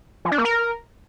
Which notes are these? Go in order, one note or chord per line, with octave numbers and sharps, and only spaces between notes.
F3
D4
A#3
A#4